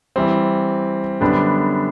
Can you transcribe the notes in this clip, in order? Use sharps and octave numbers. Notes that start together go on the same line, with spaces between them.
E3 G3 C4
F#2 D3 G3 B3 D4